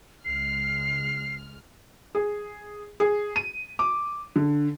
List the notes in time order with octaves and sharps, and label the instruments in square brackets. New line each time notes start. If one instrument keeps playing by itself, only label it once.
[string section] C#2 G#3 F6 [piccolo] C7
[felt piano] G#4
G#4
D#7
D6
D3